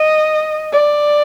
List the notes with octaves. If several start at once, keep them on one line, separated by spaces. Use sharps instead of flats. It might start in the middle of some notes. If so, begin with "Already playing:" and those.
Already playing: D#5
D5